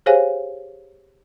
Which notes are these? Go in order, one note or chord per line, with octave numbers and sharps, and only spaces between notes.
G4 G#4 C5 C#5 F5 G#5